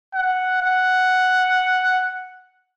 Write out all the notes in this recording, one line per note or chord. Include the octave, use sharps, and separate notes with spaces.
F#5
F#5